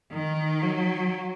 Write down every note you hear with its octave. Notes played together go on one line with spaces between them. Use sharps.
D#3
F#3